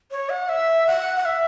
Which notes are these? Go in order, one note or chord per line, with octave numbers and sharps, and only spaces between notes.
C#5
F#5
E5
F#5
F#5
E5